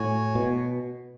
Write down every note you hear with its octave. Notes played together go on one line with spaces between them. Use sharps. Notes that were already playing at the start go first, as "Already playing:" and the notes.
Already playing: A2 F#4 C#5 G#5
B2